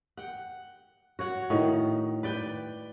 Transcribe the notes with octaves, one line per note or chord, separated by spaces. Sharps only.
F#5 G5
F#4 C#5 F#5
A2 D#3
B4 D5 G5